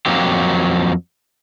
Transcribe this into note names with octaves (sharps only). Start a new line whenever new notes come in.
F2 F#3 A#3 G4